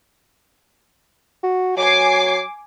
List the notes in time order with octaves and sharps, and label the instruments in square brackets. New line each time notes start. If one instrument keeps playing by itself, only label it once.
[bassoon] F#4
[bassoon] F#3 [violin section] G#5 D6 C7